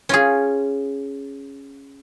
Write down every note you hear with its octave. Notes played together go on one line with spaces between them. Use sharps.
C#4 F4 G#4